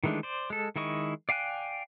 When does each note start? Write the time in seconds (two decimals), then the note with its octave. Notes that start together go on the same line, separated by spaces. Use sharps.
0.04 D#3 E3 G#3 A3 D4
0.23 C5 D5
0.50 G#3 A4
0.76 D#3 G#3 E4 D#5 C#6
1.29 D5 F5 G5 G#5 F#6